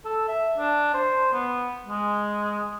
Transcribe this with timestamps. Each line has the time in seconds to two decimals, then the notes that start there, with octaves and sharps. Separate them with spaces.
0.05 A4
0.28 E5
0.58 D4
0.94 C5
1.33 B3
1.87 G#3